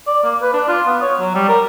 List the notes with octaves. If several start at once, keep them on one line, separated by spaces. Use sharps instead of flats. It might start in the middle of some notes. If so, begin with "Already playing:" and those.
D5
A#3
B4
D4
F4
B3
C#5
F#3
G3
A#4